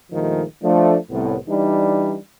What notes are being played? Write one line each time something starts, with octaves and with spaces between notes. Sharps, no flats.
A#1 D#2 D#3 F3 G#3 A3
F3 A3 D4
C2 A2 B3
E3 G3 D4 D#4